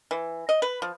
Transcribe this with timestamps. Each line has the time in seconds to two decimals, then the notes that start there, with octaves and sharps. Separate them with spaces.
0.11 E3
0.49 D#5
0.62 B4
0.82 F3